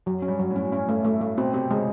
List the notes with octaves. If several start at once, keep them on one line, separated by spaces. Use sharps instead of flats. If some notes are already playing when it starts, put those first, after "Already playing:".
F#2 F#3
C#4
G2
F#3
A2
C#4
C#4
A3
A3
A3
B2 C4
C3 C4
C#3 G#3